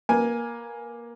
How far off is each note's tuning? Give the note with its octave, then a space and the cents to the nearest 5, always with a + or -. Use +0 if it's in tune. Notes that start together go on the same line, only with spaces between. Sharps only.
A#3 +15 B4 +0 G#5 +0